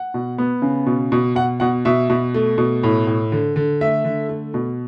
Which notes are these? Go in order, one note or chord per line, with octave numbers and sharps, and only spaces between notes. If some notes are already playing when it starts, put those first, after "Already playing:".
Already playing: F#5
B2
B3
C#3
B2
B2
B2 F#5
B2 F#5
B2 E5
B2
A3
B2
A2
A2
D3
D3
A3 E5
D3
A3
B2